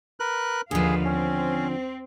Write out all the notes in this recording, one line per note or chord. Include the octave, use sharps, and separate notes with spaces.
A#4 B4 F#6
D#2 D3 F3 G#4 B4 F5
C4 C#4